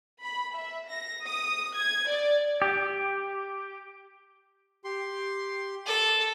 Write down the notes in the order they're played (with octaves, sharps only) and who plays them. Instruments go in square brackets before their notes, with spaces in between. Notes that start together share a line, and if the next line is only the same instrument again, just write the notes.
[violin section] B5
E5
A#6
D#6
G#6
D5
[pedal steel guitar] G4
[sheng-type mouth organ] G4 C6
[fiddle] A4